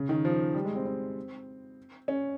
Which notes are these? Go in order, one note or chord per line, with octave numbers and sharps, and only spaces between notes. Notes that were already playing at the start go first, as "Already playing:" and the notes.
Already playing: C#3
D#3
F3
G3
G#3
C4
C4
C#4